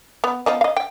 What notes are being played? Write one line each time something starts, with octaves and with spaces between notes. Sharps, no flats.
B3
F3 B3 D#5
D#5 F5
G5